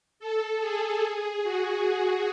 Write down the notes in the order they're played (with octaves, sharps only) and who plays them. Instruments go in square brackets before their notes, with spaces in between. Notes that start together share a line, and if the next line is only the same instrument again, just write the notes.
[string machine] A4
G#4
G#4
F#4